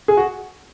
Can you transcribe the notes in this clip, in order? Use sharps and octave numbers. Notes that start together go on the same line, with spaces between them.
G#4
F#4